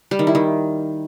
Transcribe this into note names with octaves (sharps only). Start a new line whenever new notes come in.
G3
D#3
E4
D#3